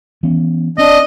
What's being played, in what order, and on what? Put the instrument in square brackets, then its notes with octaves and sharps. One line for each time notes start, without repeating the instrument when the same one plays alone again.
[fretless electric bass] E3 B3 C#4
[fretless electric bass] C4 [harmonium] D4 [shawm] D#5